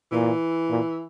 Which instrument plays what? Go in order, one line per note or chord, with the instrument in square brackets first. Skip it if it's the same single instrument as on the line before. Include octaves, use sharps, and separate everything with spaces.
[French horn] A#2 [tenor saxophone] E3
[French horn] A#2